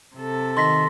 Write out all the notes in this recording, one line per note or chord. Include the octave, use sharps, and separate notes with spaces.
C3 A4
D#3 C6 A#6 B6